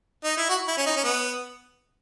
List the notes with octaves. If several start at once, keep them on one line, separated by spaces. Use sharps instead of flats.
D#4
E4
F#4
E4
C#4
D#4
C#4
B3